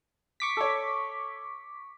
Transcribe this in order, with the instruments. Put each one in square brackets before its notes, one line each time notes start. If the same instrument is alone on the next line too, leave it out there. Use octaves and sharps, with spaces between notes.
[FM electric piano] C#6 D6 B6
[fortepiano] A4 C#5